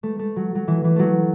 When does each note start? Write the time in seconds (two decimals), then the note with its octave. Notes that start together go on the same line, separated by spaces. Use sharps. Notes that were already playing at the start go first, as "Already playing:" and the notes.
0.03 A3
0.19 A3
0.36 F#3
0.55 F#3
0.68 E3
0.84 E3
0.96 F#3 A3